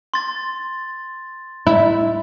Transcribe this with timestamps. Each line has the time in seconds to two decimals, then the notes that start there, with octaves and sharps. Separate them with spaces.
0.14 C6 A6
1.67 E4